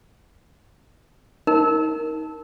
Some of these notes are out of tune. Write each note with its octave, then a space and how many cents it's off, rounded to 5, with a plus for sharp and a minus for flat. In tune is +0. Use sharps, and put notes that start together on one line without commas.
D#4 +15 A#4 +0